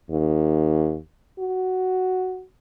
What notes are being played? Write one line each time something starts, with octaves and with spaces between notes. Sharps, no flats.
D#2
F#4